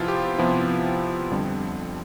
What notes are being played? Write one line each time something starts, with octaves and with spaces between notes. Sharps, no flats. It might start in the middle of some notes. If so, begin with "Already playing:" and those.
Already playing: C3 F3 B3 E4 F4
G4
C3 F3 B3 E4
F2 D3 G3